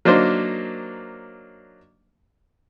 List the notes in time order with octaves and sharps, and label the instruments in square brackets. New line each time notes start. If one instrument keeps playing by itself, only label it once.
[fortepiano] F#3 A#3 D4 D#4 C5